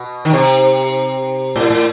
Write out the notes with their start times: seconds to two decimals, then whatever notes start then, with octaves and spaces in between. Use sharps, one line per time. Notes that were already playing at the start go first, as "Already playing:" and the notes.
Already playing: B2
0.25 D#3
0.33 C3
1.56 A2
1.70 A2